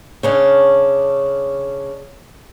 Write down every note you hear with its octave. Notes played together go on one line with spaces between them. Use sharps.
C#3 C#4 D4